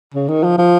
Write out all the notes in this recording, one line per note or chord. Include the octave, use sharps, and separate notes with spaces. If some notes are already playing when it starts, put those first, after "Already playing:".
C#3
D#3
F3
F3